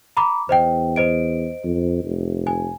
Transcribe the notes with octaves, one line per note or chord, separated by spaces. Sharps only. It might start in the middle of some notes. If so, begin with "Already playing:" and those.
A#5 B5 D6
E2 C5 D#5 G5
C5 D#5 D7
F2
F1
G#5